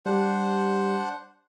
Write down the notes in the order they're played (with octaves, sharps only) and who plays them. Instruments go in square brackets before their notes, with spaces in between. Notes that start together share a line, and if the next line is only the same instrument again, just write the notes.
[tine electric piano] G3 G4 [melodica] D4 C5 F#5